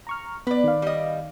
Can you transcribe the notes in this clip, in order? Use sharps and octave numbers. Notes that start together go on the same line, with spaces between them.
A#5 C#6 F6
B3 B4 D5
D#3 F5
G3 D#5